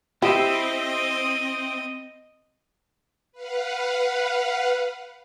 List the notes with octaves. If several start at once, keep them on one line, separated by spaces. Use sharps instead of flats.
C4 E4 G4 C5 D#5 E5
B4 F5 F#5